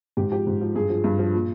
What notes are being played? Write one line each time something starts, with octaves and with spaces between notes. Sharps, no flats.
G#2 G4
F3 G4
G#2
F3
G2 G#4
F3
G2
F3
A#2